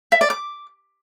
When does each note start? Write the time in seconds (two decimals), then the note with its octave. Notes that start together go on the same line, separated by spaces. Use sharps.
0.12 E5
0.21 D5
0.30 D6